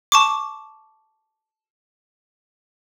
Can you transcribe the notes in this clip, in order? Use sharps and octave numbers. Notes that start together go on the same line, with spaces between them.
A5 C#6 D6